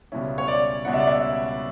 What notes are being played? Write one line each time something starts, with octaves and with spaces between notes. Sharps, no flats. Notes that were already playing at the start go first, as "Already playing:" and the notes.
C#2 B2 G3 C#4 E4
C#5
D5
C#2 B2 G3 C#4 E4 F#5
E5
D5
E5